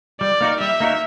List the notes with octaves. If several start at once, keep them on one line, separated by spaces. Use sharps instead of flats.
G3 D5
A#3 D#4 F#4 A#4
G3 E5
A#3 D#4 F#4 A#4